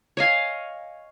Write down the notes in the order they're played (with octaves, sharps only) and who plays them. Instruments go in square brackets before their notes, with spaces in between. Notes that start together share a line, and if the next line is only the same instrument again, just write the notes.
[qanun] C#5 D#5 F5 G#5